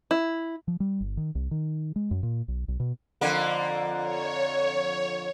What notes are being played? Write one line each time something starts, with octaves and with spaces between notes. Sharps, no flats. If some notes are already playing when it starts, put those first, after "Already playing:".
E4
F3
G3
G1
D#3
C2
D#3
G#3
F#2
A#2
B1
B1
B2
F2 D3 A#3
C#5